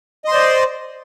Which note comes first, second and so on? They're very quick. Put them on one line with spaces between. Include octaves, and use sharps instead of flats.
D#5 C6 C5 D5